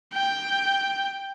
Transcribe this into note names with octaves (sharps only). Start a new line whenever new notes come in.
G5